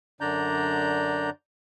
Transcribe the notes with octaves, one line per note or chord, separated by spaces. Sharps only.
F#2 D3 D4 D5 A#5 G6